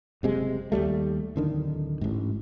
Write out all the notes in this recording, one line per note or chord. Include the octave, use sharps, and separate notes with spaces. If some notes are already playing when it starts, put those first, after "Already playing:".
F#1 C3 G#3
D#2 G#2 G3 A3
D1 D3 D#3
A1 G#2